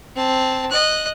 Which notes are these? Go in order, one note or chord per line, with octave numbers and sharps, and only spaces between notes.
C4 A5
D#5 F#6